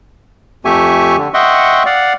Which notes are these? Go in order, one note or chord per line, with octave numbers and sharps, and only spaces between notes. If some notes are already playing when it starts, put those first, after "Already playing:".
F2 A3 G4 E5 G#5 C#6
D3
D#5 E5 F#5 G5 C6 C#6
D5 F5 F#5